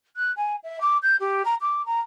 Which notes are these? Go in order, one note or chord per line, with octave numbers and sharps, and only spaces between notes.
F#6
G#5
E5
D6
G6
G4
A#5
D6
A#5